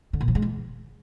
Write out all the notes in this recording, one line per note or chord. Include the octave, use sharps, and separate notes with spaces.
D3
A#2
F3
G#3
E3